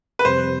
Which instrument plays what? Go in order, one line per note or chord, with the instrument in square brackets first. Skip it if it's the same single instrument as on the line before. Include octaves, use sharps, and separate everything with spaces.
[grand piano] B4
[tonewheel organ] F2 C3 G3 C4 [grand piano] C5